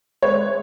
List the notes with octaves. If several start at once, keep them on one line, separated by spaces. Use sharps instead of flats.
G#3 B4 C#5